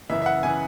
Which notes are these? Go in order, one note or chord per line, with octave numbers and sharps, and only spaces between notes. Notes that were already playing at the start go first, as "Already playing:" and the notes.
F#2 C#3 E3 E5
E5
F#5
C#3 E3 G#5